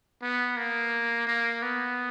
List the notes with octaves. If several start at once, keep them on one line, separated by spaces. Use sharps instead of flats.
B3
A#3
A#3
B3